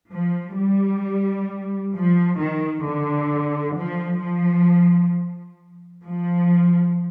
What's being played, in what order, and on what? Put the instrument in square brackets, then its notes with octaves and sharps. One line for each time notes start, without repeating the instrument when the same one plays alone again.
[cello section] F3
G3
F3
D#3
D3
F3
F3
F3